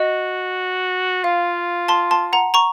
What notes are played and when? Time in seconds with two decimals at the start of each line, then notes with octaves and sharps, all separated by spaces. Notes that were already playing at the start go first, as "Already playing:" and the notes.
Already playing: F#4 D#5
1.24 F4 F5
1.88 A5 C6
2.11 A5 C6
2.33 F#5 A#5
2.54 A#5 C#6